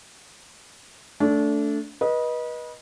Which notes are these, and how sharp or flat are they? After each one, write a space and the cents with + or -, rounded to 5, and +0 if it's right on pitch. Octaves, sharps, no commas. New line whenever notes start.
A3 +0 D4 -25
B4 -30 D#5 +0